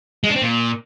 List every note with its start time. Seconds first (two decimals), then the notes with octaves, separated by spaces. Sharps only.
0.24 G#3
0.30 D4
0.36 C4
0.42 A#2